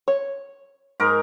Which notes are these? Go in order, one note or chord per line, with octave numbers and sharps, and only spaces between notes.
C#5
G#2 A#4